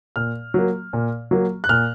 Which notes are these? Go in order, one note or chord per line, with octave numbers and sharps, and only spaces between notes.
A#2 F6
F#3 A#3
A#2
F#3 A#3
F#6
A#2 F6